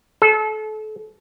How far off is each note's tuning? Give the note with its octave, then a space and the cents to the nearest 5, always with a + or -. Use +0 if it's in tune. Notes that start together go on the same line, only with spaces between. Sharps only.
A4 -30